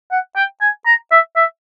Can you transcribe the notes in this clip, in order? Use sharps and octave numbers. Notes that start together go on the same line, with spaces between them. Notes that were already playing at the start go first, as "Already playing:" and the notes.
F#5
G5
G#5
A#5
E5
E5